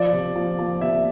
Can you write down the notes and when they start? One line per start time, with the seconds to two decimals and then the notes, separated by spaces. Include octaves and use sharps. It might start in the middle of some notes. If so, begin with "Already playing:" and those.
Already playing: F3 D5
0.13 C3
0.35 F3
0.59 F3
0.81 C3 E5